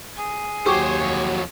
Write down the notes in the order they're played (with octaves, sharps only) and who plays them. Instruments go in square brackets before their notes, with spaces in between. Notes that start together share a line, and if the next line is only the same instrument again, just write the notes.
[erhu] G#4
[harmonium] D#2 F#3 F#4 [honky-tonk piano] G4 C#6 D6 [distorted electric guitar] C5 C#5
[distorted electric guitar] F2 C#5